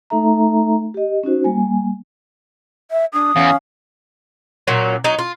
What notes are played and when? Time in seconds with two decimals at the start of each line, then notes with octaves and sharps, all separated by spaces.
0.10 A3 D#4 A4 E5 A#5
0.94 G4 D#5
1.23 C#4 D#4 F#4 C5
1.44 G3 A#3 G#5
2.91 E5
3.14 D4 D#6
3.36 E2 C#4 F5
4.67 A#2 F#3 C#4
5.04 F#3 D#4
5.19 F4